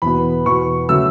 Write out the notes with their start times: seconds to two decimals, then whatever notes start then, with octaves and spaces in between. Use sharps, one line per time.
0.02 E2 B2 B3 B5
0.46 E2 B2 B3 C#6
0.89 C#3 F#3 A3 E6